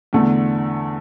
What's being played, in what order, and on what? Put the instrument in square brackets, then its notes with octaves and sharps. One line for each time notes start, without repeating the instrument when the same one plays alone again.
[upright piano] E2 D3 A3